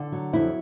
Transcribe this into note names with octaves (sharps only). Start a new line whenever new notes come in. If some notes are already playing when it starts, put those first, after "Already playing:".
Already playing: D3
F#3
F2 E4